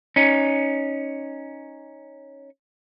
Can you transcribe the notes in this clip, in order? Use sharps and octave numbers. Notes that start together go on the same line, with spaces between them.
C#4 D#4